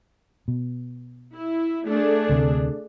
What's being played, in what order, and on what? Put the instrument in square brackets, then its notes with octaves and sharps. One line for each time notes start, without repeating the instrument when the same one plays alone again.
[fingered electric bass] B2
[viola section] E4
A3 D4 G#4
[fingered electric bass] D2 C3